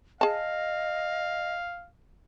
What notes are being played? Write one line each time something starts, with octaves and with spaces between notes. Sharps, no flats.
G#4 D#5 F5 A5